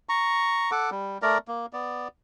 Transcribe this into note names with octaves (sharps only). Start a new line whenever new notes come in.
A#5 C#6
A4 F#5 D6
G3
A3 A#4 D5 A#5
A#3
B3 D5